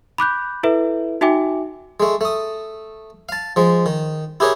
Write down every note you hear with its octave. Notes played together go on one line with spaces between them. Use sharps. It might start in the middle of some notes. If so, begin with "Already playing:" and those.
B5 D6 F#6 G6
E4 A4 B4 E5
D#4 F#4 E5 G5 G#5 D6
G#3 A3
A3 D#6
F5 A5
F3 G#3
D#3
E4 G4 G#4 A#4 C#5